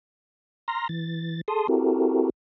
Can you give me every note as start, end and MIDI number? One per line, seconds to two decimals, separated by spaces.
0.68 0.88 82
0.68 0.88 84
0.68 0.88 89
0.68 0.88 94
0.89 1.41 52
0.89 1.41 93
1.48 1.67 68
1.48 1.67 69
1.48 1.67 81
1.48 1.67 84
1.48 1.67 87
1.68 2.30 60
1.68 2.30 64
1.68 2.30 66
1.68 2.30 67
1.68 2.30 69
1.68 2.30 70